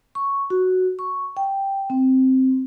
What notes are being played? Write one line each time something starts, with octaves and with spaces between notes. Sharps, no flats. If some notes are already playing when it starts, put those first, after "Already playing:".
C#6
F#4
C#6
G5
C4